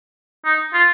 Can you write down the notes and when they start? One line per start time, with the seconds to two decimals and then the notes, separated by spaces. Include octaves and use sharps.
0.45 D#4
0.74 F4